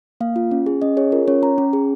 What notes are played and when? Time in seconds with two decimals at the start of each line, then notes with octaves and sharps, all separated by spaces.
0.21 A#3 F5
0.36 F4
0.51 C#4
0.66 G#4
0.82 C#4 D#5
0.97 G#4 C#5
1.12 F4 A#4
1.28 C#4 C#5
1.43 C#4 A#5
1.58 C#4
1.73 G#4